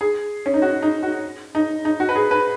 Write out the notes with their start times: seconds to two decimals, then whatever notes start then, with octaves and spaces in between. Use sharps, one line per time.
0.01 G#4
0.46 C#4
0.54 D#4
0.62 F#4
0.82 D#4
1.03 F#4
1.55 D#4
1.85 D#4
2.00 F#4
2.09 B4
2.15 G#4
2.31 B4